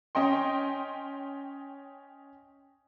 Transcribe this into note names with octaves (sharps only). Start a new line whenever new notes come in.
C#4 D#5 G5 C6